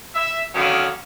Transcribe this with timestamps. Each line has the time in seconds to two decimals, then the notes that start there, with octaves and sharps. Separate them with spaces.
0.15 E5
0.55 D3 D#3 F#3 A#3 B3 C#4